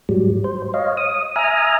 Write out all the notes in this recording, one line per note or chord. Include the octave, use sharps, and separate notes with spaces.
G#2 F#3 G3
C5
C#5 D#5 F5
D#6
E5 G#5 A#5 D#6 F6